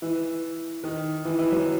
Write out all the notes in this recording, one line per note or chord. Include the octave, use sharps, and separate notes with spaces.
E3
D#3
E3
E3
F#3